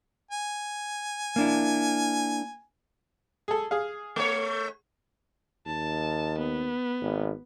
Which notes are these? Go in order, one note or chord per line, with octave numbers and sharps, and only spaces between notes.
G#5
A#3 D4 E4
G#4 A4
G#4 F5
A3 C#5
D#2 A5
B3
G#1